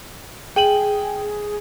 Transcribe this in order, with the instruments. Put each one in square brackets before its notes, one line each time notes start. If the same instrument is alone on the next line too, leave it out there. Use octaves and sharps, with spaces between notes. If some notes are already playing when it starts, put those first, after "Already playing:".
[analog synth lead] G#4 [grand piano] G5 D#7 F#7